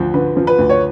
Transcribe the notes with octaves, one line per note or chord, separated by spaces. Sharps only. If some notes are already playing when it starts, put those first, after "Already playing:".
Already playing: D2 F3
D3 B4
F3
B4
D2
C#5